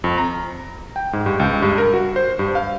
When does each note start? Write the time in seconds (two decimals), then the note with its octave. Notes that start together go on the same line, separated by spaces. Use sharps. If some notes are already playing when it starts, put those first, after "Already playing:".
0.04 F2
0.18 A#5
0.96 G5
1.13 G#2
1.26 G2
1.40 C#2
1.62 G2
1.78 A#4
1.94 F#4
2.16 C5
2.39 G2
2.55 F5